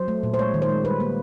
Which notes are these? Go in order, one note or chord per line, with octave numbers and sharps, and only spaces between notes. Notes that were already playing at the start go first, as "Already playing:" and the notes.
Already playing: F#3 C5
A3
A#2
C5
G#3 C#5
D#3
C5
G#3
G3 B4
A#3